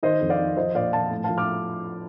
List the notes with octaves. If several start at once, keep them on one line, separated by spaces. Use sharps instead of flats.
D#3 C5 D#5
F2
D5 F5
D#3
F3 C5 D#5
A#2 D5 F5
F3 F5 A5
A2
F3 F5 A5
D6 F6